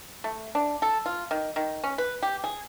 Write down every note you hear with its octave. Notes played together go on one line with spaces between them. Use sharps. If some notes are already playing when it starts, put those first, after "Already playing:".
A3
D4
A4
F4
D#3
D#3
C#4
B4
G4
G#4